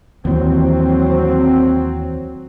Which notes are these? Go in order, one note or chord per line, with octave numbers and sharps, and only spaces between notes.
D#2 E3 F#3 C4